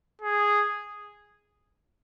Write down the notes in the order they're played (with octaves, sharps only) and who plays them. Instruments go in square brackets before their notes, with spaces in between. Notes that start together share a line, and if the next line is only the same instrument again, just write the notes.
[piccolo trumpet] G#4